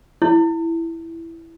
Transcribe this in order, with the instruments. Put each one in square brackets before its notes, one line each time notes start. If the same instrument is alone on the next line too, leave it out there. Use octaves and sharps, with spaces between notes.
[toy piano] E4